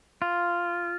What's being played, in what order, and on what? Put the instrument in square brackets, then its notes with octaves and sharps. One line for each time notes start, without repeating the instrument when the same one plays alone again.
[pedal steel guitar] F4